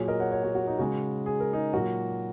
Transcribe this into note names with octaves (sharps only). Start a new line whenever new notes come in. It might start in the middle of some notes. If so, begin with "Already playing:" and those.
Already playing: A#2 F#3 G#4 C#5
A#4 D#5
C#5 F#5
C#5 F#5
F#4
F#4
D#4
C#3 G#3 F#4
G#4
A#4
D#4 G#4
A#2 F#3 F#4 A#4